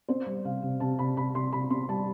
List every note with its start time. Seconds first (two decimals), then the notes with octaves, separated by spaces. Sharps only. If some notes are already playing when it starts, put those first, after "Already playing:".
0.09 C4 C5
0.27 G3
0.45 C3 F5
0.63 C3
0.80 C3 A5
0.99 C3 B5
1.17 C3 B5
1.34 C3 C6
1.52 C3 B5
1.70 C4 C6
1.89 G3 A5